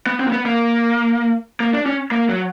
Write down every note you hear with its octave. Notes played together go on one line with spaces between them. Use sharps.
B3
C4
A#3
B3
A#3
A#3
D4
C#4
A#3
F#3